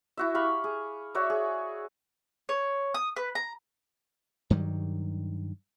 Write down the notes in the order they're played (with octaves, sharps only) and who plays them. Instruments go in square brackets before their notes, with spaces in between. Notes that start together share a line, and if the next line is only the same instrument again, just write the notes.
[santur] E4 F#4 E5
G4 F5 B5 C#6
G#4
F#4 C#5 D5 E5
G#4
[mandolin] C#5
D#6
B4
A#5
[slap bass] G2 D#3 F#3 G3